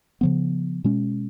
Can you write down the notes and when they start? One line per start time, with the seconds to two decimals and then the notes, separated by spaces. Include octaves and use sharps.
0.21 C#3 F3 B3
0.84 B2 G#3 C#4